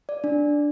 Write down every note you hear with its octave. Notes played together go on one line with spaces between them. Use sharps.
D5
D4